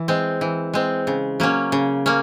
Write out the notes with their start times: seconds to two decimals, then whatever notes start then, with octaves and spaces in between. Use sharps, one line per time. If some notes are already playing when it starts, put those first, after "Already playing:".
Already playing: E3
0.08 G#3 C4
0.41 E3
0.73 G#3 C4
1.07 C#3
1.40 F#3 A#3 C#4
1.72 C#3
2.06 A#3 C#4